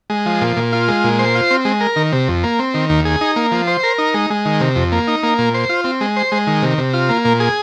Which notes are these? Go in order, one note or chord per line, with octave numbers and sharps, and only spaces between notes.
G#3
F3
A#2
A#2
F4
G#3
A#2
C5
F4
C4
G#3
A#4
D#3
C3
F2
A#3
C4
D#3
D#2
G#4
D#4
A#3
F3
C5
A#4
D#4
G#3
G#3
D#3
C3
F2
A#3
D#4
A#3
A#2
C5
F4
C4
G#3
C5
G#3
D#3
C3
C3
F4
A#3
A#2
G#4